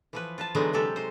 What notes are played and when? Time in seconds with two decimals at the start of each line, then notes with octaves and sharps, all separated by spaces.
0.13 E3 F3 B4
0.38 F4 B4 A5
0.55 D3 E3 F#3 G#3 B3 D#4
0.73 C3 F#3 G#3 G4 A4 E5
0.96 D#4 C5